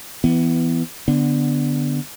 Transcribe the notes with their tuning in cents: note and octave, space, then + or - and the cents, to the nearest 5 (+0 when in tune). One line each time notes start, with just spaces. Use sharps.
E3 +0 B3 +15
D3 +0 B3 +0